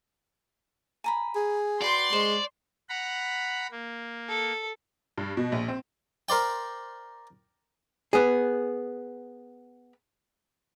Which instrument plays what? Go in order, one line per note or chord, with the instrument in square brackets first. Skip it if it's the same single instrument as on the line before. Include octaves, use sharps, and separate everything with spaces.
[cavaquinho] G#5 A#5 B5
[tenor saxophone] G#4
[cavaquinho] F#4 B4 G5 [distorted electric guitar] D5 [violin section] C6
[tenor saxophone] G#3 [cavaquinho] C5 C#6
[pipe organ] F#5 A#5 B5
A#3
[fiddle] A4
[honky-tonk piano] G2
B2
A#1
C4
[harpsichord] A#4 C5 D5 G5
[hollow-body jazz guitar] B3 G#4